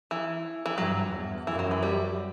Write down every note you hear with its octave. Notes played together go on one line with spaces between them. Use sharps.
E3
E3
G2 F#3
E2
F#2 E3
F#3
E3
G3